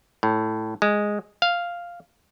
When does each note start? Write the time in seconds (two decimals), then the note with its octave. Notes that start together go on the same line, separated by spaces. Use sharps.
0.23 A2
0.82 G#3
1.42 F5